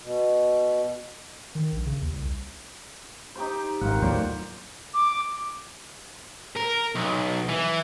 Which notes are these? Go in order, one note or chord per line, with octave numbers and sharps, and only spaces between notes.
B2
D#3
A#1
C#3
D#2
C2
D#4 G4 C5
G#1 D#3 F4 F#5
D#2 A2 F#3 C5 D5 F#5
D6
A#4
B1
E3